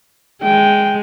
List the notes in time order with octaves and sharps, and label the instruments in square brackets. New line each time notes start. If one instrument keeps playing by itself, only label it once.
[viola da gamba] G#3 [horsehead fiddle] G5